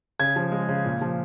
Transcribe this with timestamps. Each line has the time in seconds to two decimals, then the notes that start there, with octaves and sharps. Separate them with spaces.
0.20 C#3 G#6
0.36 F3
0.52 G#3
0.69 C#3
0.85 A#2
1.01 F3